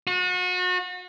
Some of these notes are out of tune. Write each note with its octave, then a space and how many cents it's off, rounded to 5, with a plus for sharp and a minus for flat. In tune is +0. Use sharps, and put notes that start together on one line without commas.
F#4 -35